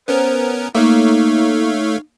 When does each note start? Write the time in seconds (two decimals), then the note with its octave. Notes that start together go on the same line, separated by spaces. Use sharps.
0.08 B3 C#4 A#4 C5
0.75 A3 A#3 D#4 C#5 F5